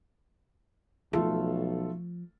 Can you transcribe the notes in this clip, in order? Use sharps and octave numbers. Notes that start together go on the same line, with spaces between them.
B1 F3 A3 F4 A4